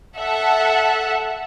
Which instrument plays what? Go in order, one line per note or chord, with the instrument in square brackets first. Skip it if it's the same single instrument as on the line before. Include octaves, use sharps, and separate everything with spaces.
[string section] A4 E5 F#5